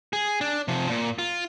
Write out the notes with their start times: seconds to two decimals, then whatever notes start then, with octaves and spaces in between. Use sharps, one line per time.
0.13 G#4
0.41 D4
0.68 C3 F3
0.89 A#2
1.19 F4